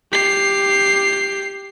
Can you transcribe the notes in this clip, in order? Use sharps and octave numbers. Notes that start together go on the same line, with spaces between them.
G4 C7